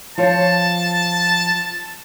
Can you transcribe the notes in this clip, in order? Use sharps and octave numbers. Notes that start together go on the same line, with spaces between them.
F3 F4 C#5 A5